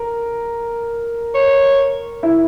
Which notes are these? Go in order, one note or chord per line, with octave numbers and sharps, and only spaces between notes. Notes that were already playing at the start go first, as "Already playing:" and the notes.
Already playing: A#4
C#5
E4